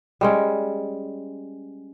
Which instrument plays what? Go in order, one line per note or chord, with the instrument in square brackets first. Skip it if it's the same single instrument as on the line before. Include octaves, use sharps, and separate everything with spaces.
[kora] G3 G#3 C#4